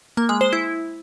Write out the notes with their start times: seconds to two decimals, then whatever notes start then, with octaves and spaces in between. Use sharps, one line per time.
0.17 A#3
0.29 G#3
0.41 C5
0.53 E4